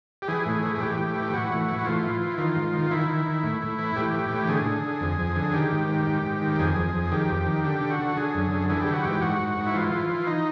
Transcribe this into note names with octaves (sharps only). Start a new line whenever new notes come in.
G4
E3 G#4
A2
E3
G#4
A2 G4
A2
E3
E3 F#4
A2
E3
F#4
A2 F4
E3
E3
D#3 F4
G#2
D#3
D#3 E4
D#3
D#3
A2
A2
E3
A2 G4
E3
A2
D3 G#4
D3
D3
F2
F2
D3
D#3 G4
G#2
D#3
G#2
G#2
D#3
F2 G#4
F2
F2
D#3 G4
F2
D#3
D3 G4
D3
F#4
D3
D3 G#4
F#2
D3
E3 G#4
G4
E3
F#4
G#2 G4
G#2 F#4
G#2
G#2
E4
E3 F4
E3
E3
D#4